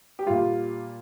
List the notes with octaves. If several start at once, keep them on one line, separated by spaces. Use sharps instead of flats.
G4
A#2 G3 F4